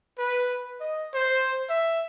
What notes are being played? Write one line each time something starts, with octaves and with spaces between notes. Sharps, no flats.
B4
D#5
C5
E5